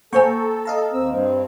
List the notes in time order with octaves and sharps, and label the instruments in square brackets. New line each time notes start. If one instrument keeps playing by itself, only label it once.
[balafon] A#3 C5 G#5 [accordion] A4 [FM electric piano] G5 A#5 C#6
[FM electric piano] D#5 F5 A#5
[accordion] D#2 C4 E6
G2 C4